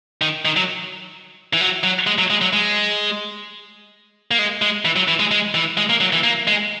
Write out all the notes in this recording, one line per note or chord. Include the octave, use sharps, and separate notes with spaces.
D#3
D#3
F#3
E3
F#3
F#3
G#3
F#3
G#3
F#3
G#3
A#3
G#3
G#3
E3
F#3
E3
G#3
G#3
E3
G#3
A#3
F#3
E3
A#3
G#3